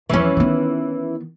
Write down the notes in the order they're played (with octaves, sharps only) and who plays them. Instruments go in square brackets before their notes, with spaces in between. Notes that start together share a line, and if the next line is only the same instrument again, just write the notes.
[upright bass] E2 F3 [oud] E3 C#4
[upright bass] D#3 B3